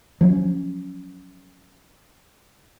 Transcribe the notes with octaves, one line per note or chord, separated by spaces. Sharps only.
F3 F#3 C4 C#4